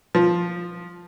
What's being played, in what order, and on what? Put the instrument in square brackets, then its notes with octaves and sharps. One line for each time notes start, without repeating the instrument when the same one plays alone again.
[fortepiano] F3